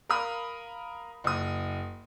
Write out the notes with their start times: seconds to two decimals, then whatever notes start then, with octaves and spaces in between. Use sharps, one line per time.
0.09 A#4 F5 B5 D#6
1.24 F#1 D#6